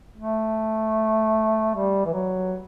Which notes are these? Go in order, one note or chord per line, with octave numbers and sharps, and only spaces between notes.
A3
G3
E3
F#3